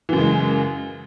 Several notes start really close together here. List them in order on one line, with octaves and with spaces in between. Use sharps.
E3 F#2 C#3 G#3